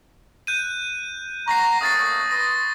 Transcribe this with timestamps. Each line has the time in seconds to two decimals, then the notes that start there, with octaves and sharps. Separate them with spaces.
0.47 F#6 G6 D#7
1.48 F#5 A#5 C#6 A#6 C7
1.81 A3 A#3 C#4 D#6 A6 C7
2.31 B4 C6 D#6 A#6